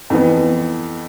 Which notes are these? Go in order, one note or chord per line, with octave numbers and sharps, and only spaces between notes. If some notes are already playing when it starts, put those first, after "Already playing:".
F2 E3 B3